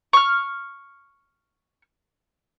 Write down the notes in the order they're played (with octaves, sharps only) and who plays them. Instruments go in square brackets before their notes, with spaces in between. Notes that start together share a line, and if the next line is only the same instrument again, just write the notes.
[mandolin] C#6 F6